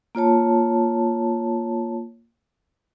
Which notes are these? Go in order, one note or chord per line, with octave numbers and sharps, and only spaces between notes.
A#3 F4 C#5 A5